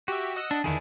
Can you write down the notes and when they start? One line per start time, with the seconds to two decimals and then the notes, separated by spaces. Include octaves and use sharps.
0.08 F#4 G4 E5
0.36 D#5 F#5 E6
0.51 D4
0.64 E2 D3 D#3 D4 E4 G#4